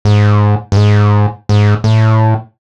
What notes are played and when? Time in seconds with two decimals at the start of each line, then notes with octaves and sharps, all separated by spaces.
0.05 G#2
0.72 G2
0.76 G#2
1.49 G#2
1.84 A2